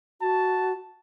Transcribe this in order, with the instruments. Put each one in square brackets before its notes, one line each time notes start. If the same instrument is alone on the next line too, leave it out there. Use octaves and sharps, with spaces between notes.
[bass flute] F#4 [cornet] A5